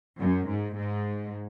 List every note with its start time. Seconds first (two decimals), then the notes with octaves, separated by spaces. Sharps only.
0.20 F#2
0.48 G#2
0.77 G#2